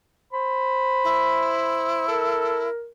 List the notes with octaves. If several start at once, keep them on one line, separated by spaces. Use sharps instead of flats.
C5 B5
E4
A4 A#4